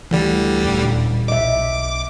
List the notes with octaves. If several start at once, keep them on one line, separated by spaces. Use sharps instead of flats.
D2 D3 E3 G3
D#1 A1
B1 D#5 E5 D6